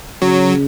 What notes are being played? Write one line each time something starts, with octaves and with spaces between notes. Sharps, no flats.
C#3 F#3